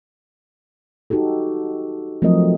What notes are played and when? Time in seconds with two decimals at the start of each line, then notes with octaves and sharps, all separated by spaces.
1.10 D#4 F#4 G4 A4
2.22 F3 F#3 A3 C4 A#4 D#5